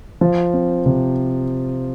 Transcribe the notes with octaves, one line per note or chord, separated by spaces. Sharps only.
F3
C4
C3